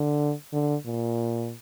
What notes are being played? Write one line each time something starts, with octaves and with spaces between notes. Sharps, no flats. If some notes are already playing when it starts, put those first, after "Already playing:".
Already playing: D3
D3
A#2